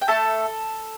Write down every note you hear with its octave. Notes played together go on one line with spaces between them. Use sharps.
G5
A3 A4 A5